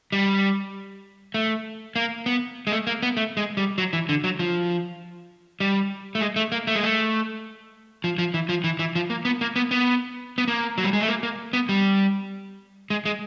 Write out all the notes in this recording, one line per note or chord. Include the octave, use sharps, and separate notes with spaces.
G3
A3
A#3
B3
G#3
A3
A#3
B3
A3
G#3
G3
F#3
E3
D3
F#3
F3
G3
A3
G#3
A3
A#3
A3
G#3
A3
F3
F3
E3
F3
E3
E3
F3
A#3
B3
A#3
B3
B3
B3
A#3
F#3
G3
G#3
A3
A#3
A#3
B3
G3
G#3
G#3